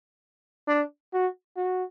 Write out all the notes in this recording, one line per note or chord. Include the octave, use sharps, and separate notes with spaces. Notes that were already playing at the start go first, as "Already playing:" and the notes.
D4
F#4
F#4